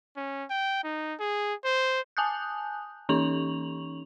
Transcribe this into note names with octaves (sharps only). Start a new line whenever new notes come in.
C#4
G5
D#4
G#4
C5
G#5 A5 D#6 F#6 G6
E3 C#4 D#4 C#6 F7 F#7